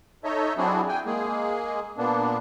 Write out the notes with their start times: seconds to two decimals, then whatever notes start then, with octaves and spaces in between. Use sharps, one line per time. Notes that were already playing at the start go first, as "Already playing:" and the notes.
0.24 D#4 A4 C#5 D#5 E5
0.57 F#3 C4 D4 E4 F#4 G#4
0.88 G5 G#5
1.06 G#3 A#3 G#4
1.98 A#2 A#3 B3 D4